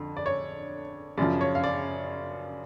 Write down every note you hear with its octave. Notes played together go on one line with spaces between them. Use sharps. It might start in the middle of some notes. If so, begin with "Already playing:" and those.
Already playing: F2 D3
D5
C#5
F#2 C#3 F3 D5
C#5
F5
D5